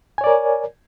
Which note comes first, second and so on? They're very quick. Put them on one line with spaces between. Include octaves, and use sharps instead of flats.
G#5 C#5 D5 A#4